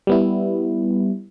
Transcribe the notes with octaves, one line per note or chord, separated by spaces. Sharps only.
G3 B3 E4